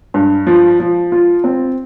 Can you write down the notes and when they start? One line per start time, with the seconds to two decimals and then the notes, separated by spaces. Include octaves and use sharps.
0.14 G2
0.47 F3
0.80 F3
1.12 F4
1.44 C4